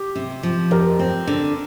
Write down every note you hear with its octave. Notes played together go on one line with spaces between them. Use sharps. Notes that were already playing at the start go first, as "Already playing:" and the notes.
Already playing: G4
C3
F3
F2 G4 A#4
C4
D3